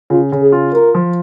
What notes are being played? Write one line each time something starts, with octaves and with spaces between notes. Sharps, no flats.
C#3 F4
C#3
G#4
F4
F4 A#4
F3